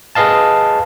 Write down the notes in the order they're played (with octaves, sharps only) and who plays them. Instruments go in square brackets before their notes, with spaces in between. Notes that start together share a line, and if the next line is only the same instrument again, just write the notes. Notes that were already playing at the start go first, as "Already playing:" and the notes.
[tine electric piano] G#4 B4 D#5 F5 A5